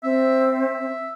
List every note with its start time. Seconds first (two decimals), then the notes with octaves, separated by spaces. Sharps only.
0.03 C4 E5
0.52 E5